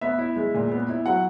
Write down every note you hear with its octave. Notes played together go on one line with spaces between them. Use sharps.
B3 E5
E4
G#3
A#2
B3
E4
F#3 F#5